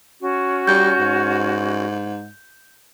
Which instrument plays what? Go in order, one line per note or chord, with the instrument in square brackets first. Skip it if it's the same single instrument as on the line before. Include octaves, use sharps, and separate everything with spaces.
[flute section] C#4 F#4
[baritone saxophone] G3 [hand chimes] G6
[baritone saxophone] G#2